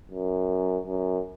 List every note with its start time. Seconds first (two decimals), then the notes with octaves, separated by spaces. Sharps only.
0.11 F#2
0.87 F#2